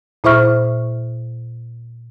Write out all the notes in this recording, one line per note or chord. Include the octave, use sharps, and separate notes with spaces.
A#2 E4 C5 E5 C#6 F6